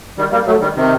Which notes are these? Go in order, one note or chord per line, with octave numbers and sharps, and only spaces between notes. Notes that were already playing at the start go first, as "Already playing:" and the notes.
D#3 G3
G3 A#3
F#3 A3
D#3 G3
C3 D#3